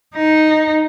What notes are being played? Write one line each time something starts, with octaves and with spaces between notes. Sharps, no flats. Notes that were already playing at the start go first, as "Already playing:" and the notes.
D#4